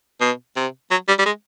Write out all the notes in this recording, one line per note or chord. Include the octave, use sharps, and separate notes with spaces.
B2
C3
F#3
G3
G3
G#3